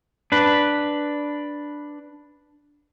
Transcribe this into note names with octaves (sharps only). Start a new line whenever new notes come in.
D4 B4